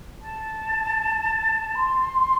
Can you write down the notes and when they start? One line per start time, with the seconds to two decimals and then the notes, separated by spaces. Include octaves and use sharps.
0.21 A5
1.75 C6